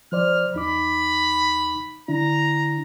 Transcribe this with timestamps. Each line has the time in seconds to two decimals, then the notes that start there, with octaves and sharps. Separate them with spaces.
0.12 F3 C5 D5 F6
0.54 E2 D#4 B5 D6
2.08 D3 D4 E4 A#5